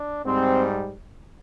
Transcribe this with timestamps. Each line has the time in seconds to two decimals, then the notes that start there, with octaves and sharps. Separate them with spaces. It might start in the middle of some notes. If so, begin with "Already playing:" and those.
Already playing: D4
0.25 G#2 G3 C4